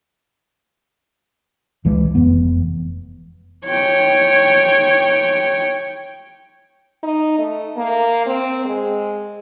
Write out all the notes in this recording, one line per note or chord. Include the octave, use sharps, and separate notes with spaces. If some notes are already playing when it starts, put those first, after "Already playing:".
C#2 E3 G#3
F1 F2 E3 B3
C#5 G5
D#4
A3
A#3
C4
G#3